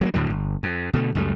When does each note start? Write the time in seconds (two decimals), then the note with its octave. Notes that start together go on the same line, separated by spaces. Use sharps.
0.01 F#3 G#3 A#3
0.14 D2 A2 D3 F#3
0.30 G1
0.63 F2
0.93 B2 D3 A3
1.15 C#2 F#2 G3 A3